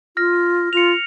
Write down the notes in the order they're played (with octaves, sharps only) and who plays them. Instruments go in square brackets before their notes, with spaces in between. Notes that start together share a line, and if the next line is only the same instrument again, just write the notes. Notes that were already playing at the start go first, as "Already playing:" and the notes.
[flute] F4 [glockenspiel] F6 A#6
[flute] F4 [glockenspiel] C#7 F7